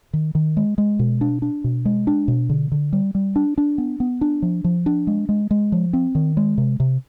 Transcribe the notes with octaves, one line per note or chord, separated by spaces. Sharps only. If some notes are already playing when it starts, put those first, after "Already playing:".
D#3
D#3
G#3
G#3
B2
D4
D4
B2
G#3
D4
B2
D3
D3
G3
G3
D4
D4
B3
B3
D4
F3
F3
D4
G#3
G#3
G#3
F3
C4
D#3
G#3
C3
C3